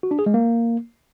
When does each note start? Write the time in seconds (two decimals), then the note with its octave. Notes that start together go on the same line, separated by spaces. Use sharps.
0.03 F#4
0.11 D4
0.19 G#4
0.26 G#3
0.34 A#3